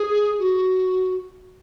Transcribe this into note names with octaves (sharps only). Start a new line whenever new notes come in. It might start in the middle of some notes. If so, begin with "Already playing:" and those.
Already playing: G#4
F#4